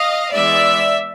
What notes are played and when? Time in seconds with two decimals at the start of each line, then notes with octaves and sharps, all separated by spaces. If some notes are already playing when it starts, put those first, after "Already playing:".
Already playing: D#5 F5
0.33 E3 G#3 B3 D5 E5